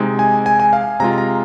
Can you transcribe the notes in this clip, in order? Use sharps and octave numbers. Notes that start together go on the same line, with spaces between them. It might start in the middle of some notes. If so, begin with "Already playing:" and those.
Already playing: C3 G#3 D#4
G#5
G#5
G#5
F5
C3 G#3 F4 A#5
A#5